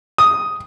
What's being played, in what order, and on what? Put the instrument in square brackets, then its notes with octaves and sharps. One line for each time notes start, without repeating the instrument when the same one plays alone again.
[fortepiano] D#6